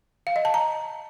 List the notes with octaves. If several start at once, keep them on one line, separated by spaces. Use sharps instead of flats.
F5
D#5
A5
A#5